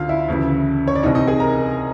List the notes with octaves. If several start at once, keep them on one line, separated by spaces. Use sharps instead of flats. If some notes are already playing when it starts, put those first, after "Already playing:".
Already playing: D2 D3 F4 F5
E4 E5
D2 C#3 E3
C#5
D5
C2 C3 E3 D#4 D#5
D#4 D#5
G#4 G#5
A#4 A#5